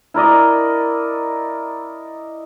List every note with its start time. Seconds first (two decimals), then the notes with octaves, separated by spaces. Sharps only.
0.14 E4 A#4 D5 D#5